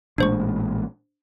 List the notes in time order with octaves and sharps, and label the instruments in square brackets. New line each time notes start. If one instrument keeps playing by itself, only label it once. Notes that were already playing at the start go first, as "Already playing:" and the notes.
[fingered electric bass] A1 A#2 G#3 [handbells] D4 C5 C#6